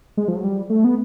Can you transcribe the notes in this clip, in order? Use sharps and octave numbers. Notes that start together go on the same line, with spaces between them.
G#3
F3
F#3
G3
A3
B3